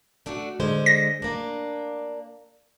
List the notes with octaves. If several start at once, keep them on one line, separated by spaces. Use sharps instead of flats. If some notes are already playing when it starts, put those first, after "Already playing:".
A3 D4 F#4
D3 G#3 C5
A#6
A#3 D4